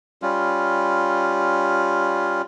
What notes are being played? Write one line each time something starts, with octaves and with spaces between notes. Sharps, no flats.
G3 C#4 F4